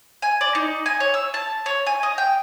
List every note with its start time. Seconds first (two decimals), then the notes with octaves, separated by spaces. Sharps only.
0.22 G#5
0.41 D5
0.55 D#4
0.86 G#5
1.00 C#5
1.14 E6
1.34 A5
1.66 C#5
1.86 G#5
2.03 D#5
2.18 G5